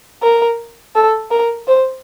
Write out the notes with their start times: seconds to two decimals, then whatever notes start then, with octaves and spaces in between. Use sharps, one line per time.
0.23 A#4
0.95 A4
1.31 A#4
1.68 C5